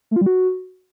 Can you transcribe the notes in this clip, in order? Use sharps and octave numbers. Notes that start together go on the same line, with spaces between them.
A3
F4
G3
F#4